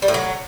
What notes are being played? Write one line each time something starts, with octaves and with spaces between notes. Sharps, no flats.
G3
A2
F#3